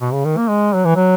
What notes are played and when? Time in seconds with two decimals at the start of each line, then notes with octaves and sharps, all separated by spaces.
0.01 B2
0.12 C#3
0.25 D#3
0.37 A#3
0.49 G#3
0.74 F#3
0.85 E3
0.96 F#3